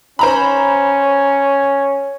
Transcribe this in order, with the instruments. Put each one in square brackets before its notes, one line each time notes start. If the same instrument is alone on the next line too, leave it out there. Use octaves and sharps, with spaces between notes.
[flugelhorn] C#4 [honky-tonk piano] C5 A#5 B5